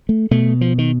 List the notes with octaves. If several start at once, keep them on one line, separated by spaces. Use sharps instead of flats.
A3
B2 A3
F3
D#3